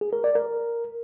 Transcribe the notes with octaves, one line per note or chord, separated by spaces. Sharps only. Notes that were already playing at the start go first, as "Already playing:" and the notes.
G#4
A#4
D5
A#4